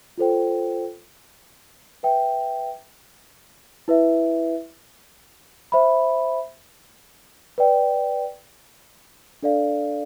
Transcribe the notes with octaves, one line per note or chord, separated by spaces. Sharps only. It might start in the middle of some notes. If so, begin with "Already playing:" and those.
F4 A4 C5 G5
B4 E5 G5
E4 B4 E5
C5 E5 B5
B4 D5 G5
D4 A4 D5 F5